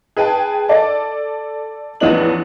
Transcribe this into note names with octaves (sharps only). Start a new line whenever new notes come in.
G#4 B4 G5 A5
A4 D5 A5
A1 E2 F3 B3 D4 F#7